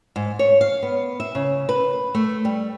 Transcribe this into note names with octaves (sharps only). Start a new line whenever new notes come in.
G#2
C#5
F5
B3
E5
C#3
B4
A3
G3